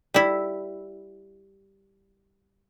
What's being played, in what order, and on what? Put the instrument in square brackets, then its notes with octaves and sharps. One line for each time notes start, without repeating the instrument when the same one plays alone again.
[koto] G3 E4